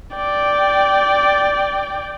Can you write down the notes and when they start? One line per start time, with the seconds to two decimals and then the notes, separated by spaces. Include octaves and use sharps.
0.16 D5 G5